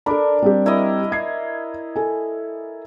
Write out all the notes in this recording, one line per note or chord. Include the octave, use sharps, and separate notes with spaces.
D4 A4 A#4 B5
G3 C4 G4
E4 A#4 D#5
G#6 C7
A4 G#5